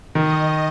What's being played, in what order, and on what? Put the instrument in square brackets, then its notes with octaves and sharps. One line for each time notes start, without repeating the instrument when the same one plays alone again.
[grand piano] D#3 [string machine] D#5